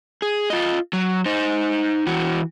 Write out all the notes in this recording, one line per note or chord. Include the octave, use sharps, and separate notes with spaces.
G#4
F4 D#5
F#3
D#4 C5
E3 F#4